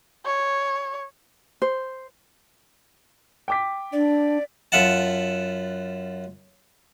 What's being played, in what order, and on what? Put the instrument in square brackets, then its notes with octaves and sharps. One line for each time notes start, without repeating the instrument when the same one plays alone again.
[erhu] C#5
[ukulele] C5
[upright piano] G5 D6 B6
[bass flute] D4 [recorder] D5
[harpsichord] F#2 F4 E5 F#5 A5